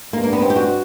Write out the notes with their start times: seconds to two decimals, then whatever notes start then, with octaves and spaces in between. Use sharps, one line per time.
0.13 G2 A#3
0.23 A#3
0.33 B3
0.42 C4
0.50 G4
0.56 F#4